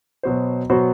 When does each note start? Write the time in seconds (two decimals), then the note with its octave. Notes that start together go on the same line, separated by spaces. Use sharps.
0.23 B2 F#3 B3 F#4 C5
0.70 B2 F#3 B3 F#4 C5